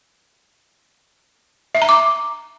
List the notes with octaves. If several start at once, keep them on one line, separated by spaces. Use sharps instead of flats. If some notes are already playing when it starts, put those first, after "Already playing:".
E5
A#5
D6